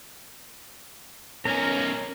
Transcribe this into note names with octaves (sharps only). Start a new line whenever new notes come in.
B1 C#4 A#4 A#5